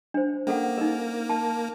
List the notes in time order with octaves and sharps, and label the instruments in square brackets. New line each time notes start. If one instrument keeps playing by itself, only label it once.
[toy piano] D4 C5
[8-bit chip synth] A#3 [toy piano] C#4 A4 F#5
[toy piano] D#4 A#4
A5